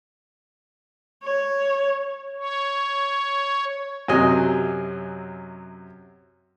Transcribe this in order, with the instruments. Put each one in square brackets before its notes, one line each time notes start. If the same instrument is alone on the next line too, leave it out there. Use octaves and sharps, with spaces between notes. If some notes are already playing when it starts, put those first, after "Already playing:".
[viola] C#5
[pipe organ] C#5
[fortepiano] F#2 C3 F#3 D#5 G#5